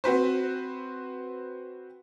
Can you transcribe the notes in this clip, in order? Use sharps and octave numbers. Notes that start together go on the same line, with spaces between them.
C4 F#4 B4 C5